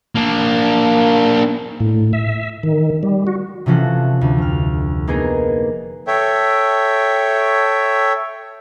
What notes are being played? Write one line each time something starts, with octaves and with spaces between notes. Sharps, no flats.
A#3 D4
A2
E5
D#3
G3
F#4
C3 E3 F3 C#4 F#4 A4
D2
F1 F6
A#3 B3 D#4 G#4 A#4
A4 C#5 E5 G5